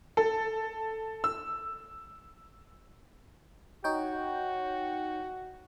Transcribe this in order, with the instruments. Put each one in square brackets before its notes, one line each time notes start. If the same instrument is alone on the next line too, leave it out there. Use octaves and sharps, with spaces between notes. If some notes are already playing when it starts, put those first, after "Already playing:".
[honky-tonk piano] A4
E6
[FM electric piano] D#4 C#5 G5 [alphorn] F#4